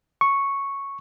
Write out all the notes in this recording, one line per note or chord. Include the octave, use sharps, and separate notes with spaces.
C#6